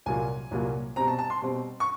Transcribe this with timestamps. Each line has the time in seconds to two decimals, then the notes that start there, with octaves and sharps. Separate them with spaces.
0.06 C2 A#2 F#3 A#3 G#5
0.51 C2 A#2 F#3 A#3
0.96 B2 G3 C4 A#5
1.08 A5
1.19 A5
1.30 C6
1.42 B2 G3 C4
1.80 C#6